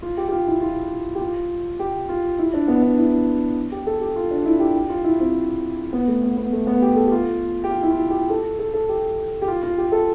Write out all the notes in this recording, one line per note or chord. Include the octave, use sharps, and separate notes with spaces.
F4
G4
G4
F4
E4
F4
G4
F4
G4
F4
E4
D4
B3
D4
E4
G4
A4
G4
F4
D4
E4
G4
G4
F4
E4
C4
B3
A3
B3
B3
A3
B3
G4
A4
G4
F4
G4
F4
E4
F4
G4
A4
A4
A4
G4
G4
F4
F4
G4
A4